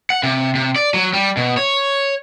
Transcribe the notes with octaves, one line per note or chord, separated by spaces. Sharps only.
F#5
C3
C3
D5
F#3
G3
B2
C#5